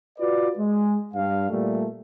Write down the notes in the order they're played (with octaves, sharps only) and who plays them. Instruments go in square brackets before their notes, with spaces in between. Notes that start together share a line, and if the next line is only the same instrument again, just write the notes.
[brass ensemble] F4 F#4 B4 D5
G#3
G2 F5
A#2 G3 A3